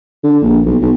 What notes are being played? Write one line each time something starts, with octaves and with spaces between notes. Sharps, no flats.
D3
A#1
B1
B1